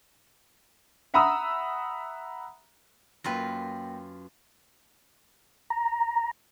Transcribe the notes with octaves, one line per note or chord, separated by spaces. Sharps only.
E5 F#5 A#5 B5 D#6 E6
F#2 A#3 F4 B4 G5 A#6
A#5